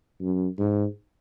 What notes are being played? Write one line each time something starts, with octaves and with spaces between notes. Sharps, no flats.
F#2
G#2